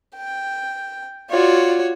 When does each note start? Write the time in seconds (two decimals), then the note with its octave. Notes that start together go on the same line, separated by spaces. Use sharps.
0.16 G5
1.30 F4 F#4 C#5 D5